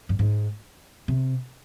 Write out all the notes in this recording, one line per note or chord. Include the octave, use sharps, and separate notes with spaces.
G2
G#2
C3